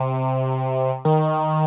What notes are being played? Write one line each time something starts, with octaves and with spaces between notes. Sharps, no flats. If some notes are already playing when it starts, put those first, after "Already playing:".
Already playing: C3
D#3